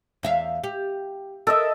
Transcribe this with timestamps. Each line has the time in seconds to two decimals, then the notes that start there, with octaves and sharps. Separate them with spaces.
0.23 E2 E5 F5
0.64 G4
1.47 A4 A#4 D#5 E5